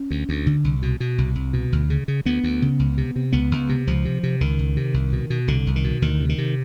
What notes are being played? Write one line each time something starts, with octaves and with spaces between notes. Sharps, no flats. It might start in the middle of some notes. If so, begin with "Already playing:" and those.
Already playing: C#4
D2
D2
D3
C2
B2
B2
C2
C2
B2
D2
C#3
C#3
D2 B3
D2
C#3
C#2
C3
C3
C#2 B3
C#2
C3
C#2 F3
C3
C3
C#2 D#3
C#2
C3
C2
B2
B2
C2 D3
C2
D#3
B2
D2 D#3
C3
D#3
C3